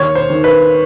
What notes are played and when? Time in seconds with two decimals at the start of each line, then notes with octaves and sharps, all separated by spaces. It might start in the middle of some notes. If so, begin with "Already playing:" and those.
Already playing: D#2 C#5
0.15 C5
0.30 D#3
0.44 B4